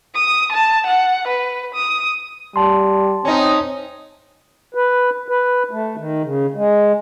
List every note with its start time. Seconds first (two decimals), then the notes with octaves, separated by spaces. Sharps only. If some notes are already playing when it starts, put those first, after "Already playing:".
0.15 D#6
0.52 A5
0.87 F#5
1.28 B4
1.75 D#6
2.56 G3 A5 C6
3.25 C4 C#4 D#4
4.74 B4
5.28 B4
5.71 A3
5.96 D#3
6.23 C#3
6.55 G#3